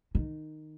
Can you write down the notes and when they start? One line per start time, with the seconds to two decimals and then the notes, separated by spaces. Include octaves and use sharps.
0.15 D#3